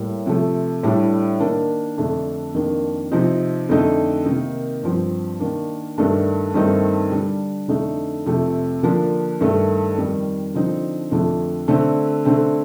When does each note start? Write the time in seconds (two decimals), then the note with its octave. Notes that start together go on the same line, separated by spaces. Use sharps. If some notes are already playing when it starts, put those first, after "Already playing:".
Already playing: A2 G3 A#3
0.26 C3 F3 A3
0.83 A2 G3 D4
1.40 D#3 A#3 D4
1.97 F2 D3 A3 D4
2.55 F2 D#3 A#3 D4
3.12 C3 F3 C4 D#4
3.69 F2 D3 A3 D#4
4.25 C3 D#3 A#3 D#4
4.83 G2 F3 C4
5.40 D#3 A#3 D4
5.98 G2 D#3 A3 D4
6.54 G2 D#3 A3 C4 D#4
7.11 D3 G3 D4
7.68 F2 D3 A3 D#4
8.26 F2 C3 F3 A3
8.83 D3 F3 A#3 D4
9.40 G2 D#3 A3
9.97 F2 D#3 G3
10.54 D3 F3 C4 D#4
11.11 F2 D3 F3 A3 D4
11.68 D3 A3 C4
12.25 D3 A3 C4